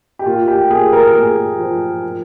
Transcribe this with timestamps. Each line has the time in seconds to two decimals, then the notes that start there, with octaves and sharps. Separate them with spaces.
0.19 G4
0.26 A#2 F4
0.48 G4
0.70 A#2 G#4
0.93 A#4
1.14 A#2 G#4
1.58 F3
2.03 F3